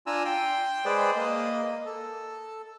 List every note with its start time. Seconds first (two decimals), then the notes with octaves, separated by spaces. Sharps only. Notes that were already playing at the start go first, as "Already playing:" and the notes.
0.07 D4 F4 G#5 A#5 E6
0.25 G5 C6
0.85 G#3 G#4 B4 C5 D5
1.16 A#3 D#5
1.86 A4